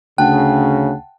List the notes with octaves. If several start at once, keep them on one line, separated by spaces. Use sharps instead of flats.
D2 C#3 F#5 G5 A5 F#6